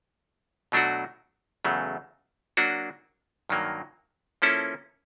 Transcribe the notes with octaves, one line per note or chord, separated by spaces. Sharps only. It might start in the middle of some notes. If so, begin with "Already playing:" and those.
B2 F#3 A3 D4 F#4
E2 C#3 F#3 A3
F#3 A#3 D4 F#4
G2 D#3 F#3 A#3
F3 A#3 C#4 E4 A4